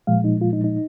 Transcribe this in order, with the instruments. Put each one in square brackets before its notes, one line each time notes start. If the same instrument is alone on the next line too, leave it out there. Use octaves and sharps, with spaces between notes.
[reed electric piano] A#2 F3 G#3 F5
D#4
F4
D#4
D#4